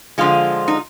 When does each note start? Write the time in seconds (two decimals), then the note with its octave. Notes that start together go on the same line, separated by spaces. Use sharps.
0.18 D3 F3 G#3 F4
0.68 D#4